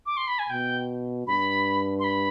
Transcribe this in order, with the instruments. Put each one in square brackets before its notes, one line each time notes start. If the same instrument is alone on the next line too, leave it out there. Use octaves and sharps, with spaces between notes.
[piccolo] D6
C6
B5
G#5
[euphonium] B2 [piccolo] G5
[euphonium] G2 [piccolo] B5
[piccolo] C6
B5